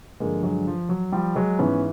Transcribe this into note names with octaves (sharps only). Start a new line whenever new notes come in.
G2 D3 F3 G#3 A#3
F#3 G#3
F3
F#3
F3 G3
F#3 G#3
G#2 E3 B3 C#4